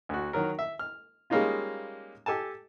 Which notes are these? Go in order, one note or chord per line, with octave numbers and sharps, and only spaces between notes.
D2 F#4
D#3 F#3 A#4
E5
F6
G3 G#3 A#3 C#4 D#4 F4
G4 A4 G#5 A5